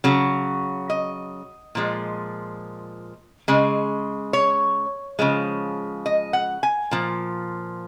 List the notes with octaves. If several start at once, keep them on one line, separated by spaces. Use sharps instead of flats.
C#3 F#3
D#5
A#2 F3 G#3
C#3 G#3
C#5
C#3 F3 G#3
D#5
F#5
G#5
A#2 F3